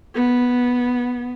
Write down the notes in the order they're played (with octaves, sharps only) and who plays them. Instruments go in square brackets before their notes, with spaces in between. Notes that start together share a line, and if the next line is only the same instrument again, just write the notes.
[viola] B3